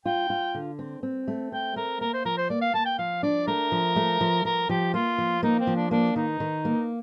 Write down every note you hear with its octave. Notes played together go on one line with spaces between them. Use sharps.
F4 G5
F4
D3
C4
C4
A3
C4 G5
A3 A#4
A#3 A#4
C5
F3 A#4
C5
A#3 D5
F5
A#3 A5
G5
F3 F5
D4 D5
A3 A#4
F3
A3
F3
F3 A#4
F3 G4
A#3 F4
F3
A#3 D#4
C4
F3
D4
A#3 D4
D#3 D#4
D#3
A#3